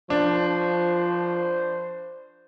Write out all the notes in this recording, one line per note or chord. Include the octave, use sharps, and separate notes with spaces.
F3 D4 C5